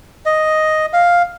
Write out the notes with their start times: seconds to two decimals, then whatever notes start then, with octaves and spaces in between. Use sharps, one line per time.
0.26 D#5
0.93 F5